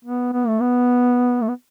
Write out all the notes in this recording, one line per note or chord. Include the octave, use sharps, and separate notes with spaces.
B3
B3
A3
B3
A3
B3